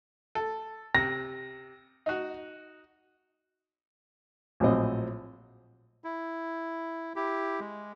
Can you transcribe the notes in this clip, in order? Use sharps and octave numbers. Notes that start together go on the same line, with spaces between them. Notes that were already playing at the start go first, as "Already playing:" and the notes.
A4
C3 A#6
D#4 F#4
A#1 A2 F#3 C4 D#5
E4
E4 G4
G#3